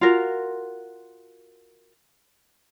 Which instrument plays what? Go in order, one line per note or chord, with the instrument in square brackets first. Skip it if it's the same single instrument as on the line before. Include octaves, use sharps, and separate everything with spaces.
[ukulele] F4 F#4 A#4